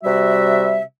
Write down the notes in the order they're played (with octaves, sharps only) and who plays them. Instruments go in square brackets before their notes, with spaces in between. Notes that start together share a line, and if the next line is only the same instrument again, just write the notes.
[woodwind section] C3 G3 F#4 E5